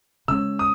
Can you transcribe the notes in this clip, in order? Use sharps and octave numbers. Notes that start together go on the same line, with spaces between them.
C#3 G#3 C#4 E6
D#6